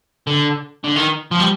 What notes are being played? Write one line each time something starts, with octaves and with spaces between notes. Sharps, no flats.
D3
D3
D#3
F3
G3